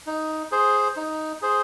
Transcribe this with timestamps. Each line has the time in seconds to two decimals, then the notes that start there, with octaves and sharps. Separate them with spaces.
0.07 D#4
0.51 G#4 C5
0.97 D#4
1.42 G#4 C5